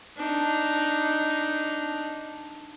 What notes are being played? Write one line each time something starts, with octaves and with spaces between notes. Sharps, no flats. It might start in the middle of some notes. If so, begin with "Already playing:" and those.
D4 D#4